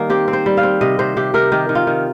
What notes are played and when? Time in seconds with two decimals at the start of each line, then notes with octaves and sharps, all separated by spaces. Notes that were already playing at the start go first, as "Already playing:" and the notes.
Already playing: D#3 G3 A#3
0.10 C4 G4
0.28 C4
0.33 C5
0.46 G3
0.57 F5
0.63 C4
0.81 C3 D#5
0.99 C3 C5
1.17 C3 G4
1.34 C3 A#4
1.52 D#3 G4
1.69 D#3
1.75 F4
1.87 D#3